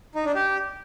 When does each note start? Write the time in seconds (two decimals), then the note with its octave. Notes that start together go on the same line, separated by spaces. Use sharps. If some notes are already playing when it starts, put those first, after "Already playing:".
0.15 D#4
0.25 D4
0.35 G4